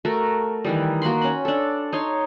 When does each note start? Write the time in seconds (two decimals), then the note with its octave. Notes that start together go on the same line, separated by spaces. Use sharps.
0.05 A3 F#4 A#4
0.65 D#3 E3 G3
1.02 A#3 F#4 B5 C6
1.21 C#4 B5
1.45 D4 A4
1.93 D#4 C#5 C6